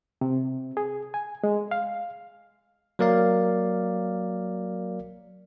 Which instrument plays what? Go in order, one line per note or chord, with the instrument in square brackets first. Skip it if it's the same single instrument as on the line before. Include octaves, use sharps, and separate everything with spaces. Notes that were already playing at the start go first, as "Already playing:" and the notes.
[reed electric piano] C3
G#4
G#5
G#3
F5
[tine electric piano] F#3 A#3 A#4 D5 F5